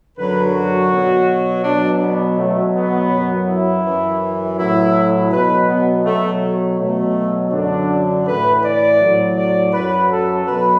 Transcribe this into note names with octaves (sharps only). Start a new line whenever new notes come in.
F#2 D3 F#3 B4
F#4
B2 F#3
B2 F#3 D4
B3
B2 F#3 A3
B3
F#2 F#3
E4
F#2 E3
A2 F#3 E4
B2 F#3 B4
B3
B2 F#3 A3
B2 F#3 A3
F#2 D3 F#3 D4
A2 E3 B4
D5
A2 F#3
D5
F#2 F#3 B4
A4
B2 F#3 B4